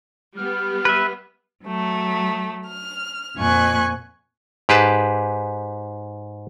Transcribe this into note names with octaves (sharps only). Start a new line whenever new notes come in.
G3 B3 F6
B4 E5
F#3 A3
F6
F2 A#2 G#5 C#6 F#6
G#2 G4 G#4 B4 A5